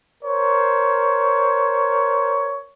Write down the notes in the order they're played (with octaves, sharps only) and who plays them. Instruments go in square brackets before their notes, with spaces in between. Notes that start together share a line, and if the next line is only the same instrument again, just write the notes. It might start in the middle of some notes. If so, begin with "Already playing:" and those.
[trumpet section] A#4 C5 C#5